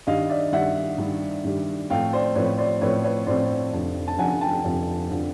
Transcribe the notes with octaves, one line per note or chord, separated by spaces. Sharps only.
G2 D#3 G3 D#5 F5
D5 E5
G2 D#3 G3 E5 F#5
G2 D#3 G3
G2 D#3 G3
A2 F3 A3 C4 F5 G5
C5 D5
A2 F3 A3 C4 B4 C#5
C5 D5
A2 F3 A3 C4 B4 C#5
B4 C#5
A2 F3 A3 C4 C5 D5
F1 F2 D3 F3
A5
F1 F2 D3 F3 F#5 G#5
G5 A5
F1 F2 D3 F3
D3 F3